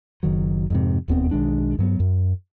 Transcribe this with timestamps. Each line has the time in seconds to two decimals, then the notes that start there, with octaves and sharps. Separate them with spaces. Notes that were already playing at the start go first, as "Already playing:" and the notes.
0.23 F#1 D#3 F#3
0.70 F2 G#2 C3
1.08 E1 D#2 B3 C4
1.31 B1 D#3 G#3 D4
1.79 G2 F#3 B3
2.00 F#2